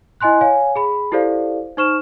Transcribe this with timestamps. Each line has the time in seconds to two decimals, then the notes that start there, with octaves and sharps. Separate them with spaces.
0.21 E4 D#5 G#5 C6 F#6
0.41 C#5 F5 G#5
0.76 G#4 B5
1.12 E4 G4 A4 C5 D5 F5
1.77 D#4 C5 C#6 F6 E7